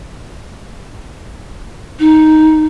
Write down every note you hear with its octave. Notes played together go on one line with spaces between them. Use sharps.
D#4